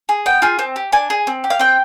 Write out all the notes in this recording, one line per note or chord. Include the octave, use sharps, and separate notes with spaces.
G#4
B3 G5
F4 G#4
C4
G4
D4 G#5
G#4
C4
G4
F5
C4 G5